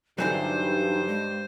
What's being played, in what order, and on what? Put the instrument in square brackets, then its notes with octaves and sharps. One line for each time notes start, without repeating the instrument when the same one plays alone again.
[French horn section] G2 [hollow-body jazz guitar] D3 E3 F#3 [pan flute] D#4 [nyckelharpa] C5
[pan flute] G#3